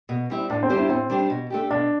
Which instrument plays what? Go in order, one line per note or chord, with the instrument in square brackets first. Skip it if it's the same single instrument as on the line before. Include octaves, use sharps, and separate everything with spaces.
[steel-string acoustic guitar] B2
G3 C4 E4
[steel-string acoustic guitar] A2 [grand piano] D4
[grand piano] C4
[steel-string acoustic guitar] G3 D4 G4 C5
[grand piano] E4
[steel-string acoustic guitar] A2 [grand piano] C4
[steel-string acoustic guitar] G3 D4 G4 C5
B2
A3 D4 G4
[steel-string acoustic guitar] B2 [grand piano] D4